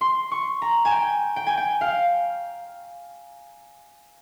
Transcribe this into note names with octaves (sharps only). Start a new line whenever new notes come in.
C6
C#6
A#5
G#5
G5
G5
G#5
G5
F5